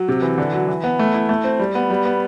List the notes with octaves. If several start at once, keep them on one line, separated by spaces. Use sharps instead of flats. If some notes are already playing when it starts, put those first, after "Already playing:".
Already playing: F#3
C3
E3
D3
F#3
E3
B3
A3
E4
A3
C4
G3
B3
G3
B3